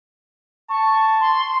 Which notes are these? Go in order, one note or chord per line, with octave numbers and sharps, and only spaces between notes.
A5 C#6
C6